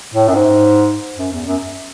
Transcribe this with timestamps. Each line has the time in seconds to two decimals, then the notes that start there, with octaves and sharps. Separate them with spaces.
0.14 A2
0.28 F#2
0.35 G#2
1.18 F#2
1.32 E2
1.46 F#2